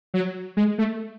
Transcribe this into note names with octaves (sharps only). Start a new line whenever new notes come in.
F#3
G#3
A3